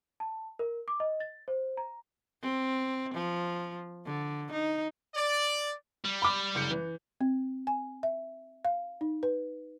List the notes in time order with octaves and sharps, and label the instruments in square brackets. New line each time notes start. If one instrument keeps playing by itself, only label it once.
[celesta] A5
A#4
D6
D#5
A6
C5
A#5
[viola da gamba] C4
F3
D3
D#4
[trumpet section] D5
[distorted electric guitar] G3
[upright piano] B5 D6
F#1 G6 C#7
E3
[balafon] C4
G#5
E5
F5
D#4
B4